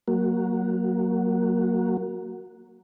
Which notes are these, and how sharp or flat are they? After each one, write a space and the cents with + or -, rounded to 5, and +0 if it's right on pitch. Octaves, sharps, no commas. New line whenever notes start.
F#3 +5 A#3 +0 F#4 +0